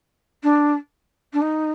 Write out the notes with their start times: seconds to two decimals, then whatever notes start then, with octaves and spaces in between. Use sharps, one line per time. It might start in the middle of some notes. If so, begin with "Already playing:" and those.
0.43 D4
1.33 D4
1.41 D#4